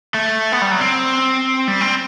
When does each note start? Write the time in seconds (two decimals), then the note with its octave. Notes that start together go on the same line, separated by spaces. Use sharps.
0.14 A3
0.52 B3
0.62 G3
0.71 F#3
0.81 C4
1.68 G3
1.81 C4